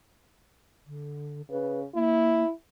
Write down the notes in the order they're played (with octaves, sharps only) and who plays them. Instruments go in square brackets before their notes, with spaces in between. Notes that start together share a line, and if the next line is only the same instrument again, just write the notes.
[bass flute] D3
[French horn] C#3 [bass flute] B4
[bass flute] A#3 [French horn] E4